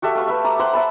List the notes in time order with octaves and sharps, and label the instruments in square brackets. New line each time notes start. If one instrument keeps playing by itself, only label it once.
[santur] F#4 G4 A4 E5
A3 F5 C#6
B4 E5
A5 A#5 D6
C5 F#5 C6
E5 A5 B5